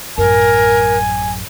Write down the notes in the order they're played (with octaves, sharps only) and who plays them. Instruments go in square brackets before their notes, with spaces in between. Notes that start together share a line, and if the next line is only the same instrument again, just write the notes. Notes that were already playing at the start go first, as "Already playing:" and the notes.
[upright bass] A1 F#2 [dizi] A#4 [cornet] G#5